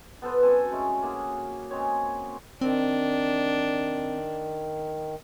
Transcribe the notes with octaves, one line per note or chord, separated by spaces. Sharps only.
B3 A4 B4 C5
F#2 C4 A4 G#5
G#3 A3 C#4
A#3 F4 F#4 G#4
C#3 G#3 C4 C#5
D#3 C4 D4